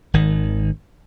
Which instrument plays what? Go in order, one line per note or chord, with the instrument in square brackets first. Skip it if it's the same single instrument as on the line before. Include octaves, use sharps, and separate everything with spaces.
[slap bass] G#1 D#3